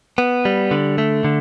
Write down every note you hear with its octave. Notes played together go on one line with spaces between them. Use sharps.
B3
G3
D3
A3
D3